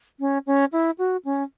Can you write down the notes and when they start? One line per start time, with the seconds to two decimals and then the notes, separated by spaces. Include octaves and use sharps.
0.20 C#4
0.46 C#4
0.72 E4
0.98 F#4
1.25 C#4